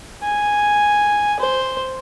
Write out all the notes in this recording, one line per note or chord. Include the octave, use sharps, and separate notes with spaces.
G#5
C5